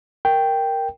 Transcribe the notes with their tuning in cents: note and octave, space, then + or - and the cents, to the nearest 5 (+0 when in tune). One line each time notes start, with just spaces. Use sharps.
A#4 +0 G5 +0